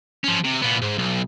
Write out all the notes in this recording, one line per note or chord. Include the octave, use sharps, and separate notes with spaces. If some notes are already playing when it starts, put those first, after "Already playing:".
F3 C#4
C3
A#2 B3
G#2
B1